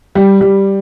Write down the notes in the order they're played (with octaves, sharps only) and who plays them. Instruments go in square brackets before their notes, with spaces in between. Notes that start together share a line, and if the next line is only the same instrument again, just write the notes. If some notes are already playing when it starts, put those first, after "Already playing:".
[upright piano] G3
G3